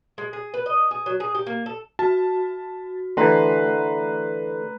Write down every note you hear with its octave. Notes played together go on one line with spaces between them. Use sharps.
G#3
G#4
B4
D#5
G#4
F#3
G#4
G4
A#3
A4
F#4 A5
D3 E3 A3 B4 A#5 C6